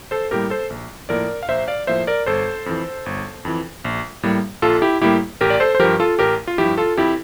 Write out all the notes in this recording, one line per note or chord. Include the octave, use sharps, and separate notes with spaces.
A4 C5
A2 G3 A#3 G4 A#4
A4 C5
A#1
A2 F3 A#3 A#4 D5
F5
A#1 C5 E5
D5 F5
A2 F3 A#3 C5 E5
A#4 D5
G1 A4 C5
F2 E3
G1
F2 E3
A#1
A2 G3 A#3
A#1 F4 A4
E4 G4
A2 G3 A#3 E4 G4
A1 G4 A#4
D5
A4 C5
C5
G2 F3 G4 A#4
F4 A4
A1 G4 A#4
F4
G2 F3 E4 G4
F4 A4
F2 E4 G4